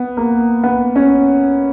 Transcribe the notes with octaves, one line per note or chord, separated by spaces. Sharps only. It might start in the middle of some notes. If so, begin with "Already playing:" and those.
Already playing: B3
A#3
B3
C#4